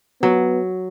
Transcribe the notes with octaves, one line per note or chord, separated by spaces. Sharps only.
F#3 B3